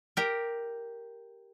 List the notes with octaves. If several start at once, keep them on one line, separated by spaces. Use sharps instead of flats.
G4 A#4